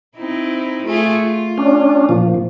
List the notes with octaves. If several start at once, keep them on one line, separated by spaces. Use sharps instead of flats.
C4 D#4 E4
A3 F4 G#4
F4
C#4 D4
A#2 F3